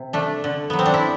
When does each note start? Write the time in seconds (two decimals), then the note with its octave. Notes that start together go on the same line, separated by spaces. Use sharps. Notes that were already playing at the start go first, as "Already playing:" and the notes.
Already playing: C3
0.13 A3 D4
0.44 D3
0.70 F#3 B3
0.79 C4
0.86 D4
0.94 E4